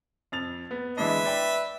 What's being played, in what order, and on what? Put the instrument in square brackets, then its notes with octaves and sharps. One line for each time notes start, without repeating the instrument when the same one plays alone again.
[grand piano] F2 A6 F7
B3
[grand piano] E3 G#3 D4 [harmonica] B4 E5
[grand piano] D5 G5 B5